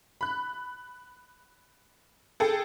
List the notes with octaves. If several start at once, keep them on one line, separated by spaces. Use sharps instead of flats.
B5 F#6
G#4 A4 G5